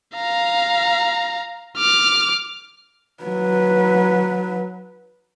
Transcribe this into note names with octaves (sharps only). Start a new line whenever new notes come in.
F5 A#5
D6 F6
F#3 B4